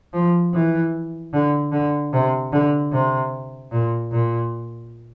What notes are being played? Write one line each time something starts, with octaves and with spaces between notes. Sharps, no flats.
F3
E3
D3
D3
C3
D3
C3
A#2
A#2